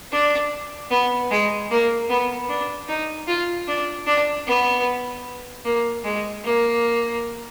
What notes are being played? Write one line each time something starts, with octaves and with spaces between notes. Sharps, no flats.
D4
B3
G#3
A#3
B3
D4
D#4
F4
D4
D4
B3
A#3
G#3
A#3